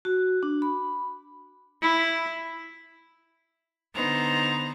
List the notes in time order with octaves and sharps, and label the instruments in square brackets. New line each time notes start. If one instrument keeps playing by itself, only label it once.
[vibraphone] F#4
D4
B5
[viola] E4
[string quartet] D3 B3 D#4 C5 A#5